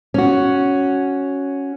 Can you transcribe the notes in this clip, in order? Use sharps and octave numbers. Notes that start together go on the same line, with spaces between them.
C#4 F#4